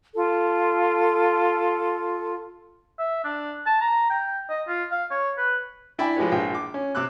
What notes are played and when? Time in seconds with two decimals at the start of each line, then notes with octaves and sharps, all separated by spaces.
0.16 F4 A4
2.99 E5
3.24 D4
3.66 A5
3.81 A#5
4.10 G5
4.50 D#5
4.68 F4
4.91 F5
5.11 C#5
5.38 B4
5.99 D4 E4 D5 G5 G#5 B5
6.16 F3 G#3 G4 B4 C#5
6.31 A#1 G#3 F4 G5
6.55 D6
6.74 C#4
6.95 C3 D6 E6 F#6